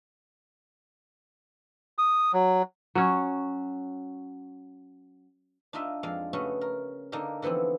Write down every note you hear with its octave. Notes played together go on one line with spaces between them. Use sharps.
D#6
F#3
F#3 C#4
D4 D#4 F4 D#5 E5
F2 G#3 D5 F5
C#3 A3 B3 C#4 F#4
A#4
D3 A#3 D4 D#4 A#4
D3 E3 F3 B3 C4